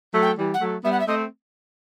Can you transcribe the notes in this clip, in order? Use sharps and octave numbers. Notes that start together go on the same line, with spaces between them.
F#3 A3
G5
E3 G3
F#5
F#3 A3
G3 B3 E5
F#5
E5
A3 C4 D#5